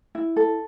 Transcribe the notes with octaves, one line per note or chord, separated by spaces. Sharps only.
E4
A4